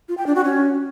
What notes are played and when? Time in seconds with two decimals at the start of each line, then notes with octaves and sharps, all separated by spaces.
0.09 F4
0.18 G5
0.27 D4
0.36 F#4
0.45 C#4